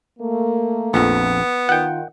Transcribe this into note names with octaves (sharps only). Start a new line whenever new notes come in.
A3 A#3
A#1 F2 B3
D#3 F4 F#5 G5